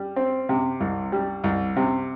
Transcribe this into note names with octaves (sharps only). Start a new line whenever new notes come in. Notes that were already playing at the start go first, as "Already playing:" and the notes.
Already playing: G3
C4
C3
C2
G3
C2
C3